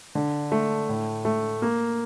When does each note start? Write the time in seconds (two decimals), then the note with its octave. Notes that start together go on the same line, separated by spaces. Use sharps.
0.15 D3
0.52 A3
0.89 A2
1.25 A3
1.62 A#3